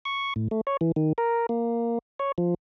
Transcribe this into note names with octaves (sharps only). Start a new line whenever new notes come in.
C#6
A2
A3
C#5
E3
D#3
A#4
A#3
C#5
F3